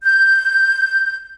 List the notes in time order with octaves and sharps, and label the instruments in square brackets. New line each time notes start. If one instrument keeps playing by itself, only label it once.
[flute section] G6